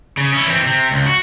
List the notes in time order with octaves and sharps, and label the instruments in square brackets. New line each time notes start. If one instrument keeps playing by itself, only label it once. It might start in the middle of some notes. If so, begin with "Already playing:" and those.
[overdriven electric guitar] C#3
C#4 E4
E3 C4
C3 C4
C#2
F#4